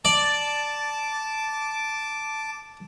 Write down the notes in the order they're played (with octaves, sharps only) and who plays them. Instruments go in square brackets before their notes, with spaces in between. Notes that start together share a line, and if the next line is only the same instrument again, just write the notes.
[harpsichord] D5 [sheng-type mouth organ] A5 D6